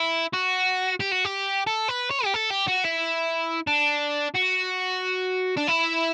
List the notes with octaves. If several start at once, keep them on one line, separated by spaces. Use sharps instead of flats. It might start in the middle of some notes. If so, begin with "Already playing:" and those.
Already playing: E4
F#4
G4
F#4
G4
A4
B4
C#5
G4
A4
G4
F#4
E4
D4
F#4
D4
E4